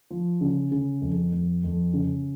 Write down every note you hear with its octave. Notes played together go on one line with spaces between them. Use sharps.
F3
C#3
C#3
F2
F2
F2
C#3